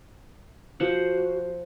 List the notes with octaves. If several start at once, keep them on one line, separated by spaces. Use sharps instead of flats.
F3 F#4 C5 F#5